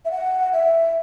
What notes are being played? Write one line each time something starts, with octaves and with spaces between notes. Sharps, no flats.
E5
F#5
E5